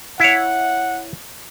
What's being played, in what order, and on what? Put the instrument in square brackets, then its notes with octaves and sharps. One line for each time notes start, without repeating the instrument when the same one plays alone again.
[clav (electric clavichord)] E4 C#5 [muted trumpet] F#5